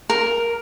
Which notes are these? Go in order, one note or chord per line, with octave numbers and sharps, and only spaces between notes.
A#4